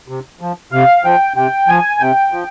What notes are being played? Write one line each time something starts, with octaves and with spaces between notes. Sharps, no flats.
C3
F3
C3 F5
F3 G5
C3 G5
F3 G#5
C3 G5
F3